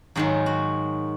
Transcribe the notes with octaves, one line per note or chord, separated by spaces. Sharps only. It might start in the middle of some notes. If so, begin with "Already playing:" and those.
G#2 D#3 F#3 G#4
F#4